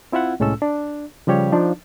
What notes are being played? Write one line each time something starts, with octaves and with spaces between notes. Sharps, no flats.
C4 E4 F4 E5 F#5
C2 A2 G#3 C#4 A4 E6
D4
C#3 F3 G3 G4 C#5
F3 D4 D#4